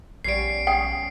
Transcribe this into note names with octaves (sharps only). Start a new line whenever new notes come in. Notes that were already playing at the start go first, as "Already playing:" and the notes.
A#1 G3 B3 C#4 C7 D7
C#4 G5